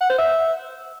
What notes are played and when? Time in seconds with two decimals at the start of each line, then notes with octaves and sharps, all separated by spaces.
0.01 F#5
0.10 C5
0.18 E5